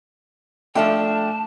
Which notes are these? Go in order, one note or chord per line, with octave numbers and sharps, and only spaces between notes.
F3 A3 D4 E5 G5 A5